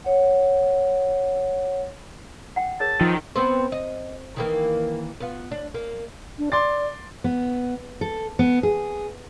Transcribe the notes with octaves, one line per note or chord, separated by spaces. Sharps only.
C#5 F#5
F#5 G5
G#4 A#4 C#5 A5
D#3 F3 E6
B3 C4 C5
D#5
D#3 E3 A#3
B3 F4
D4
A#3
D4
D5 C6 D6 A6
B3
A4
B3
G#4